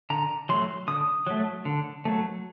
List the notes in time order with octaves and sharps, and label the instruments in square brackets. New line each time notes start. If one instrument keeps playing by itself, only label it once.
[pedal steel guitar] D3 A#5
F#3 A3 C6
D3 D#6
F#3 A3
D3
F#3 A3